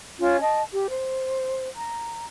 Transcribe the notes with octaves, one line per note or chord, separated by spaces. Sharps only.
C#4 F4 C#5
D#5 A5
G4
C5
A#5